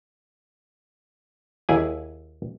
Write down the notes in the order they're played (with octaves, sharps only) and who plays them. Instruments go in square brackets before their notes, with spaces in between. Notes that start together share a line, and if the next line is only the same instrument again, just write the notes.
[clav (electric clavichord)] D#2 E4 G#4 G#5